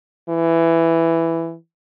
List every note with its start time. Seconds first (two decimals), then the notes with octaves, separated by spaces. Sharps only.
0.29 E3